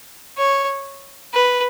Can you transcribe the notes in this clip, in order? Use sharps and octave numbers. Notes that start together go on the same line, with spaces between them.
C#5
B4